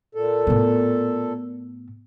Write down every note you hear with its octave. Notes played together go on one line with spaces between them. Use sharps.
A#2 A4
A2 B3